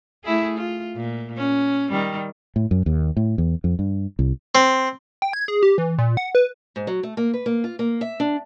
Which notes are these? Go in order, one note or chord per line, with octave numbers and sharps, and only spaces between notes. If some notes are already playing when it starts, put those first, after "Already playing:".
A3 E4 G#4
F4
A#2
C#4
D#3 G3
A2
F#2
D#2
A2
E2
F2
G2
C2
C4
G5
G#6
G#4
G4
E3
A#2
F#5
B4
G#2
F#3
A3
A#3
B4
A#3
F4
A#3
E5
D4